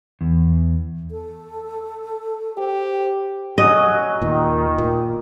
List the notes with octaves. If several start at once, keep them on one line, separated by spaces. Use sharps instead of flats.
E2
A4
G4 C5
F#3 C#4 F#4 D#5
D#2 A#2 D#3
A#2